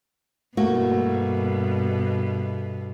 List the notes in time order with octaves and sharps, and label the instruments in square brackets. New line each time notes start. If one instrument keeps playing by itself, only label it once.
[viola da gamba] G2 B2 [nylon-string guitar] A3 A#3 F#4